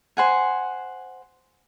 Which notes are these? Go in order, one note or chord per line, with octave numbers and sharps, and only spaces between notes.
C5 F#5 G#5